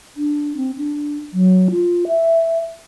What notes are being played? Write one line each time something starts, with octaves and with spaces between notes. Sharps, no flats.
D4
C4
D4
F#3
F4
E5